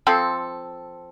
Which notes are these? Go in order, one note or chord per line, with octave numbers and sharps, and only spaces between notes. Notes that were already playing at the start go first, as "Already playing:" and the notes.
F3 C4 A4